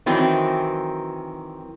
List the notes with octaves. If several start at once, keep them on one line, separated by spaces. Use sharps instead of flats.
D#3 E3 F#3 C4